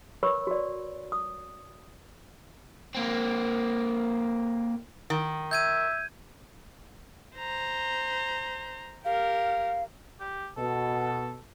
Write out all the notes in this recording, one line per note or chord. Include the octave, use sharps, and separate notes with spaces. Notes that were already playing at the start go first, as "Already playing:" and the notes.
A#4 B4 C#5 B5 C#6 E6
F#4 D5
D#6
A#3 C4
D#3
E5 G6 G#6 D#7
C5 A#5
G4 A#4 F5
G4
B2 A4